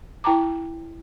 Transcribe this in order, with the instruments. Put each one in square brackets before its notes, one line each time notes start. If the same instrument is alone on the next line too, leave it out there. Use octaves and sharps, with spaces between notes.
[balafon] E4 G5 A5 A#5 D6